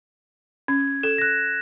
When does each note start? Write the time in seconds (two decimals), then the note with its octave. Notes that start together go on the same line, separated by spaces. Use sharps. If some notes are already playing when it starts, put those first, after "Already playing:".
0.68 C#4 G#6
1.03 A4 E7
1.18 F#6 A#6